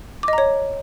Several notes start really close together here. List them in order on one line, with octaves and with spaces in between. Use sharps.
D6 D#5 A#5 C#5